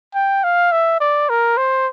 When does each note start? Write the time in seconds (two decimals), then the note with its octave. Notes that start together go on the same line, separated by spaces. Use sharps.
0.14 G5
0.44 F5
0.72 E5
1.00 D5
1.29 A#4
1.57 C5